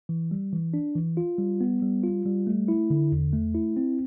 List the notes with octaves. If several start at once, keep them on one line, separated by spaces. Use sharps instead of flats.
E3
G3
E3
D4
E3
F4
G3
B3
G3
F4
G3
A3
E4
D3
E2
A3
E4
C4